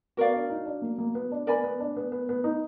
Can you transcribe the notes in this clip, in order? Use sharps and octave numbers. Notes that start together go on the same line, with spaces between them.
B3 F#4 A#4 D5 F5
D4
D#4
D4
A#3
A#3
B3
D4
B3 A#4 D5 G#5 B5
B3
D4
B3
B3
B3
D#4